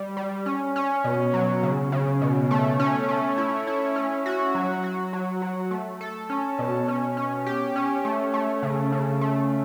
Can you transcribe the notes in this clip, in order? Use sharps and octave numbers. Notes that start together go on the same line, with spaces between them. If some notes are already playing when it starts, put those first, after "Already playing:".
Already playing: G3
G3
C#4
C#4
B2
F#3
C#3
C#3
B2
A3
C#4
A3
E4
E4
C#4
F#4
F#3
F#4
F#3
F#3
A3
A4
C#4
B2
C#4
C#4
G4
C#4
A3
A3
C#3
C#3
A3